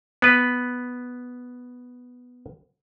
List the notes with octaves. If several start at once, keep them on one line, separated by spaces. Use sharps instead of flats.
B3 B4